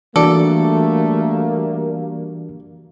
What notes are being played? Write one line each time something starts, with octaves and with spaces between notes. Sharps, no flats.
E3 G3 A3 A#3 D4 F#4 A4 D5